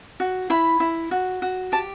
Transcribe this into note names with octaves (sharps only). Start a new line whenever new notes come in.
F#4
E4 B5
E4
F#4
F#4
G4 A5